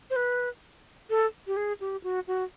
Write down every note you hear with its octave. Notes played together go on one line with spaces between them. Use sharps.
C5
B4
A4
G4
G#4
G4
F#4
F#4